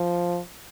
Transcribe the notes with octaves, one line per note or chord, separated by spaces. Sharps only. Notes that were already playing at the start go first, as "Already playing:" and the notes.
Already playing: F3